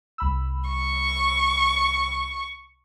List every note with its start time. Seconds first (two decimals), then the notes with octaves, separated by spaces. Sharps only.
0.18 C2 B5 E6
0.70 C#6